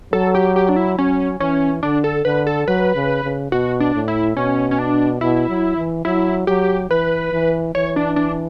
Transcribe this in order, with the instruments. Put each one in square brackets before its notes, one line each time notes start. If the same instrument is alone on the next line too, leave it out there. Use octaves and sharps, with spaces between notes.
[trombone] F#3 [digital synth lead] A4
[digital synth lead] G4
G4
D4
E4
[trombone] F#3 [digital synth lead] C#4
[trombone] E3 [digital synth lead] C#4
[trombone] D3 [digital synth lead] D4
[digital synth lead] A4
[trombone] D3 [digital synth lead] B4
[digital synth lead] A4
[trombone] F#3 [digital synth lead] B4
[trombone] C#3
C#3
[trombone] B2 [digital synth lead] F#4
[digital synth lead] D4
[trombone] A2
[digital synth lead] E4
[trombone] B2 [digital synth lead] C#4
[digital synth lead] C#4
D4
[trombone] B2 [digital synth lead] E4
[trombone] F#3
E3
[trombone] F#3 [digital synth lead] E4
[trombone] F#3 [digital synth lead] G4
[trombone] E3 [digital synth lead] B4
[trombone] E3
[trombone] E3 [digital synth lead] C#5
[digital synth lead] D4
D4